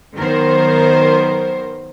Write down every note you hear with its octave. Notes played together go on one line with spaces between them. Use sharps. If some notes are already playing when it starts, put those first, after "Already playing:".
D#3 F#3 B3 A#4 C5